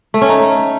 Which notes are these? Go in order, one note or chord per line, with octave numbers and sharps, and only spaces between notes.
A3
C#4
D#4